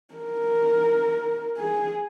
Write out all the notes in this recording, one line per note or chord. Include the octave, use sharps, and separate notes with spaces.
A#4
G#4